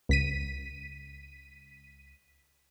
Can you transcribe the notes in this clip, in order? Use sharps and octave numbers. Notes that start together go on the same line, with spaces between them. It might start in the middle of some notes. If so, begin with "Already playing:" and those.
C#2 B6 D#7